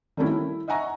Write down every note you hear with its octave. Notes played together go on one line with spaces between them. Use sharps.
D#3 G3 A3 A#3 C#4 E4
E4
D#5 E5 F#5 G#5 A#5 C#6